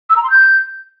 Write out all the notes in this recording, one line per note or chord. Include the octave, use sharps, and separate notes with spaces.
E6
A#5
C6
G6